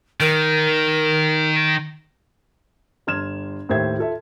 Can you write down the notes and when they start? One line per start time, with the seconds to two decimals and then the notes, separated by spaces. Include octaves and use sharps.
0.20 D#3 A#4
3.07 G1 C6 F6 G#6 E7
3.69 D#2 A2 C5 E5 G#6
3.98 F4 A4 E5